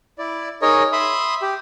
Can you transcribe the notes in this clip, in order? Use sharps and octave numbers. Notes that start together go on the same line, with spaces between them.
E4 D5
D#4 G#4 A#4 C#5 D#5
E5 B5 C6 D#6
G4